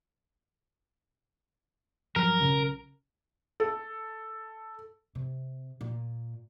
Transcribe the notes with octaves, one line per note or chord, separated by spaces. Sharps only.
G2 F3 F#3 A#4
B1 C#3
A4
C3
A#2